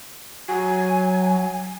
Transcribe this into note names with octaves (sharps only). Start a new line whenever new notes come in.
F#3 G#5